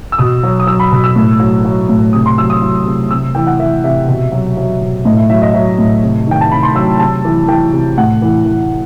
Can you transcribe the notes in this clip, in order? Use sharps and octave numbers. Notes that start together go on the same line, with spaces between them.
E6
B2 D#6
F#3
D#6
F#3 E6
B5
B2
E6
A2
F#3
F#3
A2
C3 D#6
C6
F#3 E6
D#6
F#3
C3
C3 E6
E3 G5
F#5
E3 E5
C3 E5
B2
F#3
F#3
B2
A2 D#5
E5
F#3 E5
D#5
F#3 E5
A2
C3
D#3 G5
A5
C3 B5
C6
F#3 E6
C3 A5
E3
E3 G5
C3
A2 F#5
E3
E3